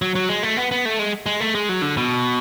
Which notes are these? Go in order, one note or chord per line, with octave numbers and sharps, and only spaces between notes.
F#3
F#3
G#3
A3
B3
B3
A3
G#3
G#3
A3
G#3
F#3
D3
B2